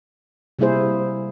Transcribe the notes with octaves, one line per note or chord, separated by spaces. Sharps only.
C3 G3 A#3 E4 G#4 C5